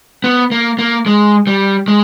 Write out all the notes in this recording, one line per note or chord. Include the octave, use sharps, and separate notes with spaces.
B3
A#3
A#3
G#3
G3
G#3